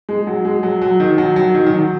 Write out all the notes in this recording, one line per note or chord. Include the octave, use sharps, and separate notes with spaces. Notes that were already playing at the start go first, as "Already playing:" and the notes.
G#3
F#3
G#3
F#3
F#3
D#3
F#3
F#3
D#3
D#3
F#3